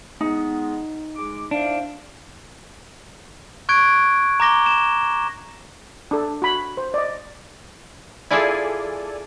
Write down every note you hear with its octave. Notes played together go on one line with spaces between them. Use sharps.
G#3 B3 D#4
G#3 D6
D4 E4 C5 F5
C#6 F#6 G#6 D7
A#5 D6 A#6 G7
E7
D4 A4
F#4 B5
C5
D5 D#5
E4 F4 G#4 A4 D5 G#5